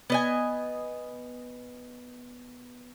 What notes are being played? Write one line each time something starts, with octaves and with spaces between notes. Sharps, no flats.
B3 D#5 G#5